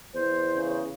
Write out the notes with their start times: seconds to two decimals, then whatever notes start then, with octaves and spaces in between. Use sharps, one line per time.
0.14 E2 C5
0.56 C#3